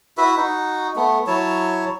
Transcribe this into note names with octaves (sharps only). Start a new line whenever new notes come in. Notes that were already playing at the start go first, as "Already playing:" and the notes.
E4 F#4 B4 E5
D#4 F#4
A3 B3
F#3 E4 C#5 A5